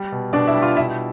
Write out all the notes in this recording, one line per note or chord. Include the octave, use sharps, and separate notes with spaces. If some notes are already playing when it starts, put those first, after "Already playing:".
Already playing: G3
B2
B2 D4 D5
E4 E5
G3
F4 F5
B2 E4 E5